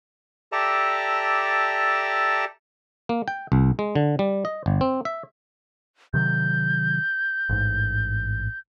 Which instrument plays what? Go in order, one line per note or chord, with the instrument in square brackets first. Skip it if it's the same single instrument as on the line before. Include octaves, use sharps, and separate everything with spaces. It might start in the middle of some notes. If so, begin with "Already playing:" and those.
[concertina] G4 A4 D5 E5 A5 A#5
[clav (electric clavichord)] A#3
G5
C2
G#3
D3
G3
D#5
G1
C4
E5
[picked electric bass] C3 D#3 F#3 [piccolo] G6
[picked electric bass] A1 G#2